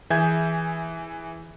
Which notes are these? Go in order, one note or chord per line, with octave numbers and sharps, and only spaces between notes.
E3 G#4 E5 G#5 G6 G#6